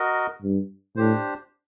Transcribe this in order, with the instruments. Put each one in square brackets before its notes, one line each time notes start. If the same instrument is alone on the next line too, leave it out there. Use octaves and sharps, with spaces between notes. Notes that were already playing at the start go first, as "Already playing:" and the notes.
Already playing: [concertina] F#4 A#4 D#5
[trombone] G2
[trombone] A2 [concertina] D4 G4 C5